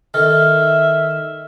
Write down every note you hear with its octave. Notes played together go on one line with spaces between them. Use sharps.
D#3 A4 E5 F6